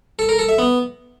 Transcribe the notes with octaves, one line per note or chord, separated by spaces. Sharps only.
A4
A#4
A4
E5
B3